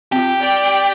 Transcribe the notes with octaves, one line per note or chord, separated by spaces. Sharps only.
C4 F4 G4
D5 G5